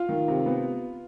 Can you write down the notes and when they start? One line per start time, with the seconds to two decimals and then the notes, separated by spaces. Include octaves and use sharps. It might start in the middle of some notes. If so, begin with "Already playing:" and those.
Already playing: F4 F5
0.09 D#3
0.28 C3
0.46 B3